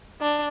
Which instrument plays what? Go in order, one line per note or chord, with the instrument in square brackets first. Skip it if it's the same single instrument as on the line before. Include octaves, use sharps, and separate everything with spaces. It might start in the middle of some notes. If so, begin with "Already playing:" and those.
[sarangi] D4